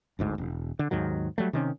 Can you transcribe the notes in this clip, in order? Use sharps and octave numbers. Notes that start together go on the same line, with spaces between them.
G1 D2 G#2
E1
D3
D#2 G#2 D#3 F#3
F#3 G3 A3
C3 D#3 C#4